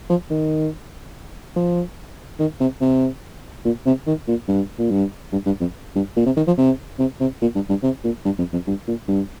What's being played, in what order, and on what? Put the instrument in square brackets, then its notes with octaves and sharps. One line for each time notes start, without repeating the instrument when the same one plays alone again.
[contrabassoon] F3
D#3
F3
D#3
C3
C3
A#2
C3
D#3
A#2
G2
A#2
G2
G2
G2
F2
G2
A#2
C3
D#3
F3
C3
C3
C3
A#2
G2
G2
C3
A#2
G2
F2
F2
G2
A#2
G2